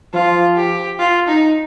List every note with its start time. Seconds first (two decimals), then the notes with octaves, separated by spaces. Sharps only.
0.14 F3 F4
0.56 G4
0.99 F4
1.28 D#4